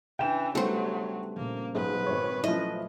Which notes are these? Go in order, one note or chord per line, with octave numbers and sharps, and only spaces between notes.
C#3 E3 D4 G5 E7
F#3 G3 A3 B3 C5
A#2 C#3 F3 A#3
B1 G#2 B4
G#1 C#5
F3 F#3 A3 C#4 E4 D#5